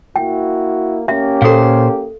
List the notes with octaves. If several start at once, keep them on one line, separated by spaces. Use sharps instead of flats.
A#3 E4 F#4 G5
A#3 C#4 G4 E5
A#2 A4 C5 F5